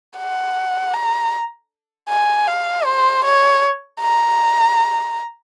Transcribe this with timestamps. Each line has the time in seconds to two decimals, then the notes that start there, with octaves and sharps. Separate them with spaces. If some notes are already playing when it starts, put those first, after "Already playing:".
0.18 F#5
0.94 A#5
2.09 G#5
2.48 F5
2.86 C5
3.25 C#5
4.01 A#5